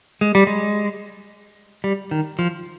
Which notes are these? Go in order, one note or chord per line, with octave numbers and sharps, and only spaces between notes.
G#3
G3
G#3
G3
D#3
F3